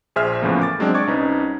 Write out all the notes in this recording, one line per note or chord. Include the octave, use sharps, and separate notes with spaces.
A#1 G#4 C5 E5 F6
E2 A2 C#3 E3 F3 A#3
D6 A6
F#3 G#3 C4 D4
D5 C#6 D6 G#6
C2 C#4 D#4 B4